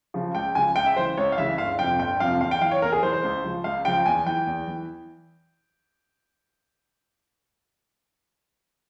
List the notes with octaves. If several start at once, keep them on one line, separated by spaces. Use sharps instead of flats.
C#3 F3
C#2 G5
C#3 F3 G#5
C#2 G5
E5
C#3 E3 C5
C#2 C#5
F5
C#3 E3 E5
G1 F5
F2 C3 F3 G5
G1 G5
F2 C3 F3 F5
E2 F5
G5
E3 F5
C#5
E2 A#4
G#4
E3 C5
C5
C#2
C#3 F3
C#2 F5
C#3 F3 G5
E2 G#5
E3 G5
E2
E3